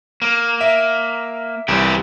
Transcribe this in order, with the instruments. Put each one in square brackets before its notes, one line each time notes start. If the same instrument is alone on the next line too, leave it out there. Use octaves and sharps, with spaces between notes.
[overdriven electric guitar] A#3
[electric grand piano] E5
[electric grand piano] C2 [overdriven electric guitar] E3 G4